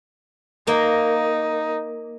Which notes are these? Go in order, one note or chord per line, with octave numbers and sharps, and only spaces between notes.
A#3 D#4